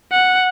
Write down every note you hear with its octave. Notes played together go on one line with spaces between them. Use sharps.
F#5